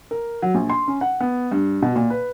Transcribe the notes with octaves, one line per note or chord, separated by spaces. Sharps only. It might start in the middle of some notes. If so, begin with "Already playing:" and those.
A#4
F#3
A#1
C6
C#4
F#5
B3
G2
B2
A#2
B4